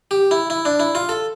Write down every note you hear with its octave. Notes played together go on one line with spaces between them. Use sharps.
G4
E4
E4
D4
E4
F4
A4